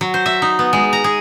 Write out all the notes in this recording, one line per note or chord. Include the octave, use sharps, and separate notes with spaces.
F#3
C5
E5
D#4
B3
G#3
A#5
G#4